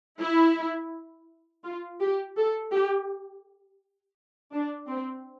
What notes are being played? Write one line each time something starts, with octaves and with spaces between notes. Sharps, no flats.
E4
F4
G4
A4
G4
D4
C4